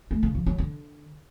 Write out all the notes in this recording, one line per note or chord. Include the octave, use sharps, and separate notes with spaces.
A3
C#3
F3
F#3
D3